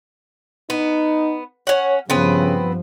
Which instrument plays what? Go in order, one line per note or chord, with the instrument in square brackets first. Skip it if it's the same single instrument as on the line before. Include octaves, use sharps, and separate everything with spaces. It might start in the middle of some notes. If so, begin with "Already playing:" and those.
[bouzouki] B3 [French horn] D#4
[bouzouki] C#4 F#5 [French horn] C#5
[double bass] G2 F3 [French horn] C#3 [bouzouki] B3 C4 B4